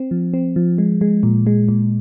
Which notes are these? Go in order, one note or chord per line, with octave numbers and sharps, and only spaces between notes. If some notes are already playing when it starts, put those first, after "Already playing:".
Already playing: C4
F3
C4
F3
G#3
G#3
A#2
G#3
A#2